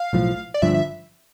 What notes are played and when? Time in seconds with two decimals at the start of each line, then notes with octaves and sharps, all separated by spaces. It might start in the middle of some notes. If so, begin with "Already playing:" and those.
Already playing: F5
0.13 B1 A2 F3
0.54 D5
0.62 G1 G2 D3 F3 E5
0.74 E5